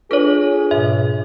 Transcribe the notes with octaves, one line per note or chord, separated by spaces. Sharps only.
D4 F4 G#4 A4 B4 C#5
G#2 B2 E5